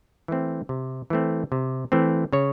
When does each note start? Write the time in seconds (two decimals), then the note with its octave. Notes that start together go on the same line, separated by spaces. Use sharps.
0.28 E3 A3 C4
0.69 C3
1.10 E3 A3 C4
1.52 C3
1.92 E3 A3 C4
2.33 C#3 C#5